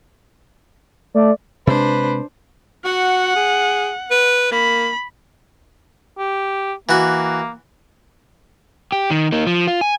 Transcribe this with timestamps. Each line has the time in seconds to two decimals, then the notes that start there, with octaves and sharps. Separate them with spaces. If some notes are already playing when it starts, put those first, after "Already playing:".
1.14 A3 D5
1.67 C3 G#3 D4 B4 C5
2.85 F#4 F#5
3.36 G#4
4.11 B4
4.52 A#3 B5
6.18 G4
6.89 E3 A#3 F#4
8.92 G4
9.11 D#3
9.32 A#3 D#4
9.47 F3
9.67 F4
9.81 G#5